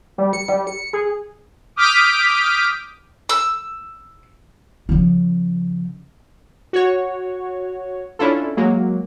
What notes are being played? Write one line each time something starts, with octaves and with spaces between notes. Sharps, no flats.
G3
C#7
G3
C#7
G#4
D6 D#6 F6 G6 B6 D7
E6
C#3 F3
F#4 C#5
C#4 D4 E4 F4 A4
F#3 G#3 A#3